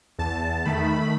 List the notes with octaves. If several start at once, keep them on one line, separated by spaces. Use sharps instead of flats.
E2 A5
D#3 A3 B5